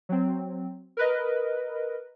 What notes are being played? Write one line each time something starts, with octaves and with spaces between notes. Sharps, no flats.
F#3 C4
A#4 B4 D#5